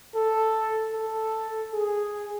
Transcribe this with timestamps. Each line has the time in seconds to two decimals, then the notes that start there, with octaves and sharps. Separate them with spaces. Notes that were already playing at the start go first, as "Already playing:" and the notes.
0.15 A4
0.93 A4
1.73 G#4